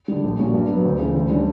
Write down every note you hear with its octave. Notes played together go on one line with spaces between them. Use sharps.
D3 G3
A#1
A#2 G3 C#4 F#4
G2
F#3 B3
D2
C#3 E3
D2
D3 G3 C#4